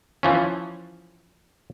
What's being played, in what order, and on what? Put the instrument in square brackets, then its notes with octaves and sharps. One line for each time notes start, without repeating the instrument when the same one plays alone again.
[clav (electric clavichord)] E3 F3 C#4